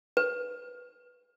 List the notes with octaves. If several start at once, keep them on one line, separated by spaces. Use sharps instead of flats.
B4